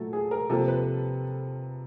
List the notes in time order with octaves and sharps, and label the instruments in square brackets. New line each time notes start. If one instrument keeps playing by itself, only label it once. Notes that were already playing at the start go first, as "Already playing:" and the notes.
Already playing: [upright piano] A#2 F#3 A3 A4
G#4
A#4
C3 F3 A#3 A4
B4